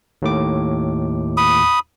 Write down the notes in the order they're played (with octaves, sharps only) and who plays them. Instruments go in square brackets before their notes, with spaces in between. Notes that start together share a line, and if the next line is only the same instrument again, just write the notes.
[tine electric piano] D#2 A2 D6
[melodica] B5 D#6